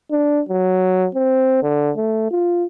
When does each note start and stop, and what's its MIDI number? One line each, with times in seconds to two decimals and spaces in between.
0.11 0.41 62
0.49 1.07 54
1.15 1.59 60
1.63 1.91 50
1.97 2.26 57
2.31 2.65 65